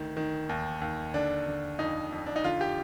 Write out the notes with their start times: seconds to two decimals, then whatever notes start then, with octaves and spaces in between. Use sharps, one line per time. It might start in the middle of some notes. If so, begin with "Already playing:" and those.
Already playing: D2 D#3
0.17 D#3
0.49 D#2
0.81 D#2
1.14 D3 D4
1.47 D3
1.79 F2 D#4
2.12 F2
2.26 D4
2.36 D#4
2.44 D3 F4
2.61 G4